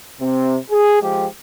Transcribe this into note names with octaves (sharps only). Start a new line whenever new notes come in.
C3 C4
G#4
F3 G#3 G4